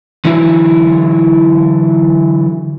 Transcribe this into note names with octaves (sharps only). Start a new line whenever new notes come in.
D3 E3 F#3 E4